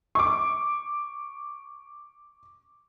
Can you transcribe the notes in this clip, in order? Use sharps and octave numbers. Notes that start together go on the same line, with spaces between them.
C#6 D6